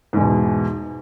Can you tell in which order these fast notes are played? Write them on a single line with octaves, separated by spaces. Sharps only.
G#2 E2 B2